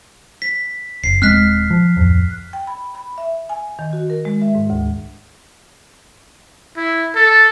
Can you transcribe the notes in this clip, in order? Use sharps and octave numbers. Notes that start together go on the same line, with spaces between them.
B6
F#1 C7
D#1 G#3 C4 F6 F#6 B6
F3
D1 F2
G5
B5
B5
E5
G#5
D#3
F#4
A#4
G#3
E5
G#2
D2
E4
A4